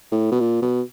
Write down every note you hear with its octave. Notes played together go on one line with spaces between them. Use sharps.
A2
B2
A#2
B2